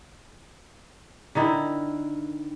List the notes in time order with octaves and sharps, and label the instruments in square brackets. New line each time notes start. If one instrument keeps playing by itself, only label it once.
[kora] D3 D#3 D#4 E4